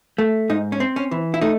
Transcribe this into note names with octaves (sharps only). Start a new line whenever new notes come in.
A3
G#2 D#4
C#4
C4
C#4
E3
E4
A3 D#4